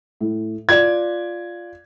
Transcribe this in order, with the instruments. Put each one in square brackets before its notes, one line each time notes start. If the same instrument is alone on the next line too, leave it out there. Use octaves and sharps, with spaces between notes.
[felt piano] A2
[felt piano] F4 D5 [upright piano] G#6